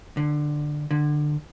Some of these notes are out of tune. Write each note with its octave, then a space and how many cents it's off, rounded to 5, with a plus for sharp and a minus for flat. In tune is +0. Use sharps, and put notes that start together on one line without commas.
D3 +15
D3 +20